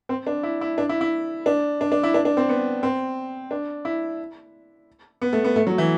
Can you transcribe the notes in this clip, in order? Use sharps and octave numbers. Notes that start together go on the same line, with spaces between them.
C4
D4
E4
E4
D4
E4
E4
D4
D4
D4
E4
D4
D4
C4
B3
C4
D4
E4
B3
A3
B3
A3
F#3
E3